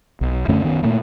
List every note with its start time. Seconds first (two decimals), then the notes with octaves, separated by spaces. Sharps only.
0.21 B1
0.48 F#2 D3 A3 C#4
0.64 D#3 B3 C#4
0.83 A#2 A3 A#3